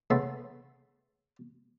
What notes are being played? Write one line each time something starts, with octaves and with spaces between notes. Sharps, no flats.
C#3 A3 B3 A4 C6